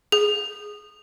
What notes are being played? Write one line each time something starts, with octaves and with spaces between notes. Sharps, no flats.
G#4